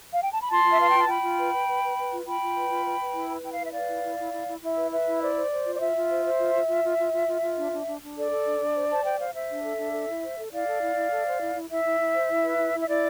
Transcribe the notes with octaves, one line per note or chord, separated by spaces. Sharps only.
F5
G5
A5
B5
F4 A5 C6
F4
E5
B4 F5
G5
F4
A5
F4 G5 B5
F4
B4
B4
B4
B4
B4
F4
F4 G5 B5
F4
B4
F4
B4
B4
E4
B4
E4 G5
F5
B4 E5
B4 D5 F5
E4
E4
E4
E4
E4
E4 E5
B4
B4 E5
E4
C5 D5
C5
C5
F4
D5
F4 E5
F4
C5
C5
F4
F4
F4
F4
F4
F4
F4
F4
D4
D4
D4
D4
A4 D5
A4
D4
D4
C5
C5 A5
C5 G5
C5 F5
C5 E5
D4
A4
D4
A4
E4
C5
A4
E4 D5 F5
A4
E4
E4
A4
C5
E4
E4
E4 E5
E4
E4
C5
E4
B4
E4
E4
E5
E4 D5